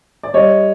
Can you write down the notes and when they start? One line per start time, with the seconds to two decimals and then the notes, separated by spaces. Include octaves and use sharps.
0.23 D5
0.33 G3 C#5 D#5